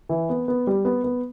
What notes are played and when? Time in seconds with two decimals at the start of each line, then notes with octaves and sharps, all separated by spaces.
0.09 E3
0.29 B3
0.48 B3
0.67 G3
0.85 B3
1.04 B3